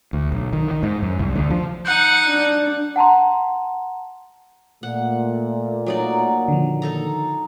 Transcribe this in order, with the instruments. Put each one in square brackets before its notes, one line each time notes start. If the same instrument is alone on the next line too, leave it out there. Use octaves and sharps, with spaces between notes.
[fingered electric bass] D2
B1
D#3
D#3
G#2
F#2
C2
D2
F3
[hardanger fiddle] D#4 F#5 [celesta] F#6 G6
[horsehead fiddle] D4
[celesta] F#5 A5 A#5 C6
[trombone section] A#2 [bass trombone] A3 [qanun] F#5
[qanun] F#3 D#4 D5
[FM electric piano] D3 F3 [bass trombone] D#3
[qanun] D#4 A4 A#5